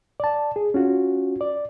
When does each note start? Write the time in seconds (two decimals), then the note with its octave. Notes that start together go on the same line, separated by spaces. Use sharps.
0.20 D5 A5
0.56 G#4
0.74 C#4 F4 F#4
1.41 D5